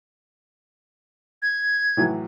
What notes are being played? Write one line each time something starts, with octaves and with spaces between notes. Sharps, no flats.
G#6
A2 E3 F#3